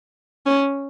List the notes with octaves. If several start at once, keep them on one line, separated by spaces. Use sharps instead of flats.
C#4